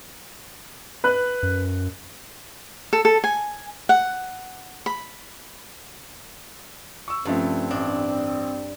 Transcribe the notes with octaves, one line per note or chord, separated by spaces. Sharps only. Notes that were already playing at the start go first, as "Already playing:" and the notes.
B4 F#6
F#2
A4
A4
G#5
F#5
B5
C#6 E6
G2 C#3 F3 A3 C4
A1 D4